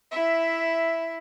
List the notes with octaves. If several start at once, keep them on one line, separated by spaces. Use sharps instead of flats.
E4 E5